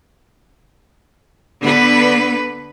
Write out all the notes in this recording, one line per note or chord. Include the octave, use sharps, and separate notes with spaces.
D3 B3 B4